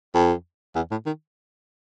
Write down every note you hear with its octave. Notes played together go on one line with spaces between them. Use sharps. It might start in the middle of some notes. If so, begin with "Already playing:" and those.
F2
E2
A2
D#3